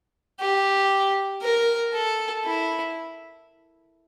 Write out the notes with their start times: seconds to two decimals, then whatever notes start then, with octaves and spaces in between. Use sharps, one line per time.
0.40 G4
1.42 A#4
1.94 A4
2.45 E4